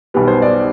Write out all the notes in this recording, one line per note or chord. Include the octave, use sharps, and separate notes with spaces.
B1 B2 G3 B4
C5
D5